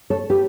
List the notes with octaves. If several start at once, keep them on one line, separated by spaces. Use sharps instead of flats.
A4 C#5
G4 B4